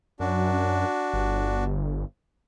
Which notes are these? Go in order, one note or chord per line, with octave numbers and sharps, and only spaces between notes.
F#2 D4 F#4
G1